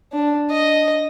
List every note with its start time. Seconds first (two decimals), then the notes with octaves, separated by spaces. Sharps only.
0.13 D4
0.51 D#5